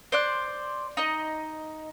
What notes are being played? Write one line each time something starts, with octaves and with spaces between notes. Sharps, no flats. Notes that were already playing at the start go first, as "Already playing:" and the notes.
C5 D5 F#6
D#4 D#5